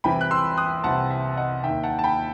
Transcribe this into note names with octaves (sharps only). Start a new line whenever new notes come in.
C2 C3 E3 G5 B5
F#6
C6 E6
D#6 F#6
C2 C3 E3 F#5 A5
E5
D#5 F#5
D#2 D#3 E5 G5
F#5 A5
A5
G5 B5